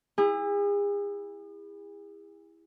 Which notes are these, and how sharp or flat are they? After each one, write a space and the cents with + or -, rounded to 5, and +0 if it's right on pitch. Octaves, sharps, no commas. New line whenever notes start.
E4 +0 G#4 -40